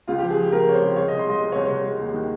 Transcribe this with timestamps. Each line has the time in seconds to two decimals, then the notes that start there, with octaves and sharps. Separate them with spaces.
0.08 C#2 F4
0.19 G4
0.23 F3
0.30 G#4
0.37 F3
0.52 C#2 A#4
0.67 C3 C#5
0.74 C5
0.82 C#2
0.96 G#3 C#5
1.08 D#5
1.11 C2
1.19 C6
1.26 G#3 D#5
1.40 C2
1.52 C#5
1.55 C2
1.63 C#5
1.70 C2
1.85 G#3
2.00 D#2
2.14 D#3